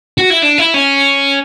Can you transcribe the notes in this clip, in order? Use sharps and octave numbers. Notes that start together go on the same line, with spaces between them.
F#4
E4
D4
E4
C#4